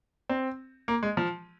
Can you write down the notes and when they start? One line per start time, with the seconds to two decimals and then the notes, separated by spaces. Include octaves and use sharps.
0.29 C4
0.88 A#3
1.03 G#3
1.17 F3